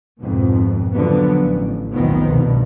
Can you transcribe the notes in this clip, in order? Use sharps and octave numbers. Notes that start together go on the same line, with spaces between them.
G#1 F2 G#2 B2
D3 F3 F#3 B3
A1
F1 B1 A#2 D#3 F3 B3
C2 G2 B2